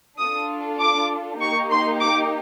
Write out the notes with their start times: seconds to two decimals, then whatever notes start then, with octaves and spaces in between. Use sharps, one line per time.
0.19 D4 F4 A4 D#6
0.80 D6
1.41 A#3 D#4 G4 C#6
1.71 C6
2.01 D6